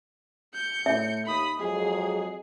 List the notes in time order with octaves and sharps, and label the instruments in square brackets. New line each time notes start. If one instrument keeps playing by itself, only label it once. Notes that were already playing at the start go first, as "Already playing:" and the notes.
[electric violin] G6 C#7
[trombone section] A2 [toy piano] E5
[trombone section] D#2 [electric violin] B5 D#6
[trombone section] F2 F#3 G#3 [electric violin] G#4